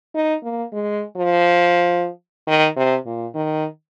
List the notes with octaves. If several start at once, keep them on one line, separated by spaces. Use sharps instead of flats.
D#4
A#3
G#3
F3
D#3
C3
A#2
D#3